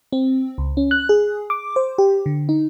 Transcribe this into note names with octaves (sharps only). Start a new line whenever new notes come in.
C4
C#2
C#4
F#6
G#4
D6
C5
G4
D3
D#4